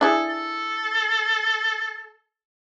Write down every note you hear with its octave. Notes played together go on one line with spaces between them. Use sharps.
D4 E4 G#4 A4
A4